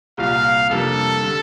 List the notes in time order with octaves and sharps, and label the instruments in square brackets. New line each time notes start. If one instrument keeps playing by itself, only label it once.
[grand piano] C2 A#2 G3 [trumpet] F5
[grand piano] F2 C3 G3 A#3 D4 [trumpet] A4
[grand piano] D3 G3